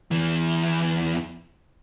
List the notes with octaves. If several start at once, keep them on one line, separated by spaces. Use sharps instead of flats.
E2 E3